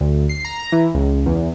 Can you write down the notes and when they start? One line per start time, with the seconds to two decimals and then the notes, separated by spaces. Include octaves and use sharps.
0.01 D2
0.29 C7
0.45 A#5
0.72 E3
0.94 C#2
1.26 E2